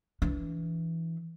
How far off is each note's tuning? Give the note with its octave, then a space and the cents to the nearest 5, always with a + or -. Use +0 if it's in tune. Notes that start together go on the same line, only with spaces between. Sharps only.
E3 +0 D4 -35